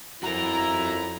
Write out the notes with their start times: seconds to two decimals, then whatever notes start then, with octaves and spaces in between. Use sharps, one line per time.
0.23 F2 E4 F#4 A#4 A#5